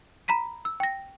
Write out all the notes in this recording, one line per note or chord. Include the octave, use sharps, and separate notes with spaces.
A#5 B5 B6 D#7
E6
G5 A#6